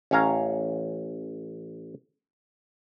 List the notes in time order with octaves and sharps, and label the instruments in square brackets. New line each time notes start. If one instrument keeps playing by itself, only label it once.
[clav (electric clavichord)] A1 C#4 C#5 F5 A#5